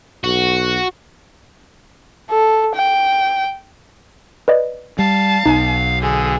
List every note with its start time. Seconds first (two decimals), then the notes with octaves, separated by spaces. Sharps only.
0.24 B1 F#4
2.31 A4
2.75 G5
4.48 B4 D5 D#5
4.99 G3 F5 A5
5.46 B1 D#4
6.01 D3 G#4